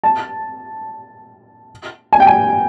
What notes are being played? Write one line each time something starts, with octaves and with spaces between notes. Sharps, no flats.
A5
G#5
G5
G#5